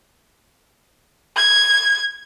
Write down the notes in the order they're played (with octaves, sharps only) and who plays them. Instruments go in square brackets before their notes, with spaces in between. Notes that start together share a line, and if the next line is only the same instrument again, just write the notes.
[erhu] G#6